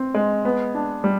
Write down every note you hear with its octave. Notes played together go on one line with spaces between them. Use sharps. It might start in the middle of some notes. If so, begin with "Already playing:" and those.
Already playing: C4
G#3
B3
D4
G3